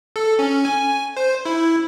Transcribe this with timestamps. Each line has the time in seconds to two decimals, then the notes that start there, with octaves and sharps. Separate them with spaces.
0.16 A4
0.39 C#4
0.65 G#5
1.17 C5
1.45 E4